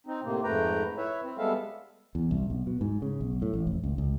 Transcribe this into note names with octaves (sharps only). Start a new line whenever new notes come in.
C4 D#4
A2 C3 A#3
F2 G#2 A3 B4 G5 A#5
E4 B4 C#5 E5
C4
G3 G#3 B3 A4 E5 F5
E2
C2
B1
B2
G#2
C#3
B1
A2
A1
F1
C#2
C#2